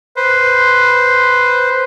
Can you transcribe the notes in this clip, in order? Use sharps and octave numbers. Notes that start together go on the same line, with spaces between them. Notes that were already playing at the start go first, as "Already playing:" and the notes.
B4 C5